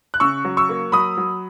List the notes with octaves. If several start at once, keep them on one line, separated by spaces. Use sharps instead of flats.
F#6
C#3 C#6 E6
F#3
C#6 E6
A#3
F#3 B5 D#6
F#3